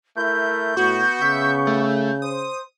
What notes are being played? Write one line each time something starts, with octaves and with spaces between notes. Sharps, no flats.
A3 E4 A#4 G6
A2 B3 F#4 C#6
C#3 E5
A3
C5 D#6